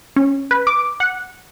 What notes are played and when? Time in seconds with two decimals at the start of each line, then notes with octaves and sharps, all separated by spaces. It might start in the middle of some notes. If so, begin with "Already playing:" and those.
0.16 C#4
0.51 B4
0.67 D6
1.00 F#5